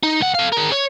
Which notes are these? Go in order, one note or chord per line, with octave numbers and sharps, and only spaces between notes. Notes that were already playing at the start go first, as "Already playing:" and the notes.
D#4
C#2 F#5
A4 F5
G#4 A#4
C#5